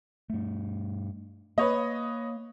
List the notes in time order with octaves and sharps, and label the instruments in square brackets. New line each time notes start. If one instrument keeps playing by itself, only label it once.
[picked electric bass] G2 A3
[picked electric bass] A#3 [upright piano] B4 C#5 D#5